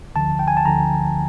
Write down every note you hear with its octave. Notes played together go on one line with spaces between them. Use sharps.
D2 D3 F3 A5
G5
G#5
A5
D2 D3 F3 A#5